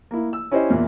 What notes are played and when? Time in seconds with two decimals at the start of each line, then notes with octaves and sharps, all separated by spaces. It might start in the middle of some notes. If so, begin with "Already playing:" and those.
0.11 A#3 E4
0.33 E6
0.52 C#4 E4 G4 C5 D#5
0.70 E2 A#2